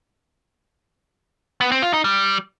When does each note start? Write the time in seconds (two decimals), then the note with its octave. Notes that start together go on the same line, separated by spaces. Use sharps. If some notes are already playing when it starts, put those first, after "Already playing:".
1.61 B3
1.72 C4
1.82 F4
1.93 D#4
2.04 G3